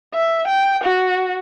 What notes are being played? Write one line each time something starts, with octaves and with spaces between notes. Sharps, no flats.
E5
G5
F#4